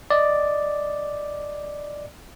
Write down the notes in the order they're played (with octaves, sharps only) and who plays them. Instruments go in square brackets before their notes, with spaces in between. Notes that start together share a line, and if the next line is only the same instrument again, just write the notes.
[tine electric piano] D5 D#5